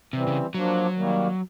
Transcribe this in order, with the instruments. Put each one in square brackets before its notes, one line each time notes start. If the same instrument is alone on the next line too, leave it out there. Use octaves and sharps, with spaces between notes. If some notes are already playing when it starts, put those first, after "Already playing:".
[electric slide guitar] C3 [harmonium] E3 G3 C4
[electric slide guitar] C#3
[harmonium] F3 A#3 D4 [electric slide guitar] F#3
[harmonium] D#3 G3 A#3